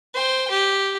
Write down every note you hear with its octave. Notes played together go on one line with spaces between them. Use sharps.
C5 G5
G4